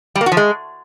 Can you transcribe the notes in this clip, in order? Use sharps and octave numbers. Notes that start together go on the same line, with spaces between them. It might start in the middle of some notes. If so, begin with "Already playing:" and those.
G3
A#3
F#4
F3
G#3